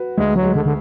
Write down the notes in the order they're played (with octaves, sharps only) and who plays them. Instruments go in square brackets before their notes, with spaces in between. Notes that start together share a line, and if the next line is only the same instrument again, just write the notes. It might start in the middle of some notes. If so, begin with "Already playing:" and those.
Already playing: [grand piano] F#4 B4
[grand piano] D2 [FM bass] G#3
[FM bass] F#3
[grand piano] G#3
[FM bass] D3
D3